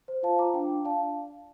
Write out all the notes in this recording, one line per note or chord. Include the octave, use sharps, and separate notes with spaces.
C5
F4 F5 A5
F4 A#5 D6
D4 G5
D4
D5 F5 A5